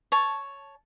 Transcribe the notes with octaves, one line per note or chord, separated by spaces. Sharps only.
C#5 A5